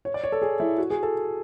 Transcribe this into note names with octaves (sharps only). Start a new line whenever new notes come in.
C#5
D5
C#5
A4
G#4
E4
F#4
G#4
A4